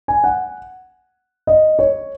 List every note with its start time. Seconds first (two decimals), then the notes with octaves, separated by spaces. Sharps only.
0.08 G#5
0.24 F#5
1.47 D#5
1.79 C#5